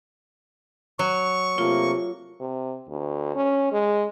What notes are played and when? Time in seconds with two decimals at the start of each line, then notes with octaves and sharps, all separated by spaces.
0.99 F#3 C#6
1.58 C3 A3 A#3 F4
2.40 C3
2.89 D2
3.35 C#4
3.72 G#3